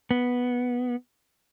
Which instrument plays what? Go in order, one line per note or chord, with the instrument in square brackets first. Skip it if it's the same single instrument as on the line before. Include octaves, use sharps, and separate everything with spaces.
[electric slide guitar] B3